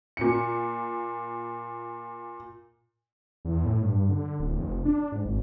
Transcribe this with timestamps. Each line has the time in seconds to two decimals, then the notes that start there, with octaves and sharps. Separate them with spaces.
0.17 A#2 C#7
3.45 E2
3.65 A2
3.82 G2
4.09 D3
4.39 D1
4.57 F1
4.85 D4
5.12 G#2
5.25 G#1